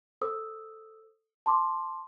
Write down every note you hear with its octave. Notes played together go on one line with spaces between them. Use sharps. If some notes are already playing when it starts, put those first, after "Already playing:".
A4 C5 D#6 E6
A5 C6 D6